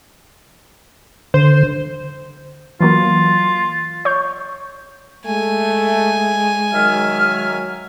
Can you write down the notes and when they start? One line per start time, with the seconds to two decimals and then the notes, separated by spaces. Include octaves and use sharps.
1.34 D3 C5
2.81 E3 F#3 A#3 F4
4.05 C#5 C#6 G6
5.26 G#3 A3 G#5
6.73 D#3 F#3 E5 F6